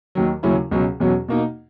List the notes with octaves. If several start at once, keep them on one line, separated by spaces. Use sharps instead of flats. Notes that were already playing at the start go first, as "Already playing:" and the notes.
D#2 D#3 F#3
D#2 C#3 F#3 C#4 E4
C#2 B2 F#3 C#4
E2 B2 F#3 C#4
B2 A#3 D#4